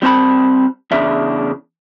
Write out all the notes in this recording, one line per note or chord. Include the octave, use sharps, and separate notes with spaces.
G3 C4 C5 A5 B5
E2 C#3 D4 E5